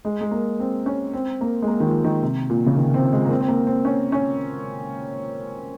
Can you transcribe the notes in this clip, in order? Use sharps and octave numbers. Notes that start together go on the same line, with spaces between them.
G#3
G#3
A#3
C4
C#4
C4
A#3
G#3
A#3
D#3
F3
D#3
C3
A#2
C#3
D#3
C4
G#3
A#3
C4
C4
A#3
C4
C#4
C#4